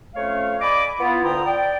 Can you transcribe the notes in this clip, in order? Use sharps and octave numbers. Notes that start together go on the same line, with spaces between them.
F2 A3 C#4 C#5 F5
D5 D#5 G#5 B5 D6
B3 E4 F4
D2 D3 F4 G5 A#5 D#6
D5 G5